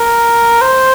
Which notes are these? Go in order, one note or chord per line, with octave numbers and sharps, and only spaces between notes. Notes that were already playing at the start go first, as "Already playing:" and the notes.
Already playing: A#4
C5